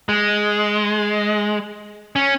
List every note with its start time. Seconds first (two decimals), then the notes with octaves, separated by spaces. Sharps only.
0.09 G#3
2.16 C#4